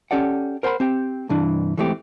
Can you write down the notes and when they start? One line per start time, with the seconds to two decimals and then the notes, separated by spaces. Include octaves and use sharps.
0.11 C#4 G4 A4 D5 F#5
0.63 A#4 C5 F#5 G#5 B5 C6
0.80 C4 G4 G5
1.29 C2 G2 E3 D4
1.78 E3 G#3 A3 C4 G4